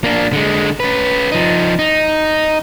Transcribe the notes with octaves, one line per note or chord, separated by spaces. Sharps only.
A#3 D4
D3 G#3
C#4 B4
F3 D#4
D#4